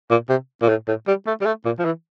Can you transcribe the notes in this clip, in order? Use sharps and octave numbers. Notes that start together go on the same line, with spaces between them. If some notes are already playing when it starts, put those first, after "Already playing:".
A#2
C3
A#2
A2
A2
G3
A3
G3
A3
A#2
F3
E3